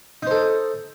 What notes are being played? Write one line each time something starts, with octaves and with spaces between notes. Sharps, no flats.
D#4 A4 C5